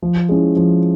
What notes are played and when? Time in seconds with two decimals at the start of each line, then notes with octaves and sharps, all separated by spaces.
0.02 F3
0.29 G#3 C#4 E4
0.56 F3